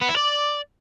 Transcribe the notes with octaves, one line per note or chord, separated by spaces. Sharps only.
B3
E4
D5